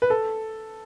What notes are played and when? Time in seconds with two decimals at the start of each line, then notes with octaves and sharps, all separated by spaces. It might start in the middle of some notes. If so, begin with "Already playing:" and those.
0.02 B4
0.10 A4